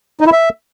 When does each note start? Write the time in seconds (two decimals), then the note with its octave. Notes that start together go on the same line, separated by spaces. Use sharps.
0.21 D#4
0.27 E4
0.33 E5